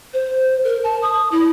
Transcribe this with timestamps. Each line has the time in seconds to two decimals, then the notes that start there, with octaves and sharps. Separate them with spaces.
0.14 C5
0.64 A#4
0.84 A5
1.02 D#6
1.32 E4